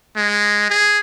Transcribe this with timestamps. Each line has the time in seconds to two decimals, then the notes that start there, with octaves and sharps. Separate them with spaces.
0.16 G#3
0.70 G#4